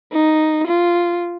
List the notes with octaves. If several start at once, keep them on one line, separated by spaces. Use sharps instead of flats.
D#4
F4